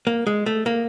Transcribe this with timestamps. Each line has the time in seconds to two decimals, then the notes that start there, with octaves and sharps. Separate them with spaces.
0.07 A#3
0.27 G#3
0.46 A3
0.66 A#3